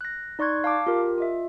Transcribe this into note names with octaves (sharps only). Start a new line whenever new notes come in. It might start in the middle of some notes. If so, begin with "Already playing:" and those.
F#6 A#6
D#4 D5 C6 C#6 F#6 G#6
F5 A5 D6
F4 G4 A#4
F4 D#5 E5